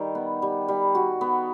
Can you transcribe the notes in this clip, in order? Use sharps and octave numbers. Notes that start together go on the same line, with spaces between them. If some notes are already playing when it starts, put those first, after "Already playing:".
Already playing: D#3 G3 D#4
B3
G3
G3
F#4
B3